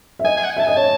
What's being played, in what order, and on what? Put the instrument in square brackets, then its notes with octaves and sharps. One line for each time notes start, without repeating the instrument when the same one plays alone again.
[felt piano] E5
[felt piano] D#5 [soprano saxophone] G#5
[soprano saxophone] G#5
F#5
G#5
[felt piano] E5 [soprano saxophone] A5
[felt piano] D#5 [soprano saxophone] G#5
[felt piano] C#5 [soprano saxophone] A5